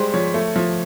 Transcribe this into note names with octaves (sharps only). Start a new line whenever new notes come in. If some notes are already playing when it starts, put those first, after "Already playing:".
Already playing: G3 G#3 C5
F3 C#5
A3
F3